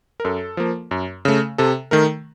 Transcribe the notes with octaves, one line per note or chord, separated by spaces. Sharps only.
A#4
F#2 A4
F3 A#3
F#2
C#3 A3
C3 A4
D#3 A3 A#4